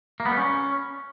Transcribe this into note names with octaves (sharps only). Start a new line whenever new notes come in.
A#3
B3
G3
C#4